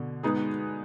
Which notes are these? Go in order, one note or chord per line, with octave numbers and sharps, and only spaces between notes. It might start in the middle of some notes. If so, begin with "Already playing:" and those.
Already playing: B2 D3
G#3 B3 D#4 G#4